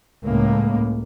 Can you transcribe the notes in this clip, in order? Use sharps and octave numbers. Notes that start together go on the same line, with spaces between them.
C#2 A2 A#3